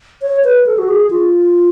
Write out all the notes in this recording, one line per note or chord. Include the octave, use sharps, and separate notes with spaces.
C#5
B4
A4
F#4
G#4
F4